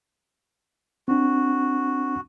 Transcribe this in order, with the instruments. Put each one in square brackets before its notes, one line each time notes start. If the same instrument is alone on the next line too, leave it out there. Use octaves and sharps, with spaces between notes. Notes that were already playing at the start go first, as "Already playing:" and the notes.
[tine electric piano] C4 D4 [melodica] F#4